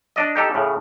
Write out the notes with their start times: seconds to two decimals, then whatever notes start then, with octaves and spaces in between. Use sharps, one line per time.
0.16 D4 D5 D#5
0.35 D#4 G4 A4
0.54 A2 C#3